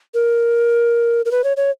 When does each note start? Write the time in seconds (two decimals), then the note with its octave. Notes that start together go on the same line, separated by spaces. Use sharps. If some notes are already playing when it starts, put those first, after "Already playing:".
0.14 A#4
1.25 A#4
1.31 B4
1.44 C#5
1.57 C#5